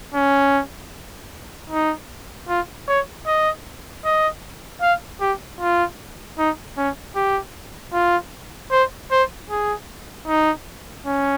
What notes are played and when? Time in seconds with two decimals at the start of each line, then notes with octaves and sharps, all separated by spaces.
0.14 C#4
1.70 D#4
2.49 F4
2.88 C#5
3.26 D#5
4.05 D#5
4.82 F5
5.21 G4
5.60 F4
6.38 D#4
6.77 C#4
7.15 G4
7.93 F4
8.72 C5
9.11 C5
9.50 G#4
10.27 D#4
11.06 C#4